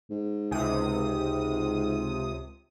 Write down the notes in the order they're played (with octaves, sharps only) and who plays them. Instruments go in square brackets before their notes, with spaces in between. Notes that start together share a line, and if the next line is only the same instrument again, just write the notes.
[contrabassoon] G#2
[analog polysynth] C#2 C3 D#6